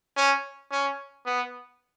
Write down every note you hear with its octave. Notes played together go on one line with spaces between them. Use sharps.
C#4
C#4
B3